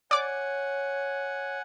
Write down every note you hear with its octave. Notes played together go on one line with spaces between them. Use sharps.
C#5 D5 F#5 G#5 D6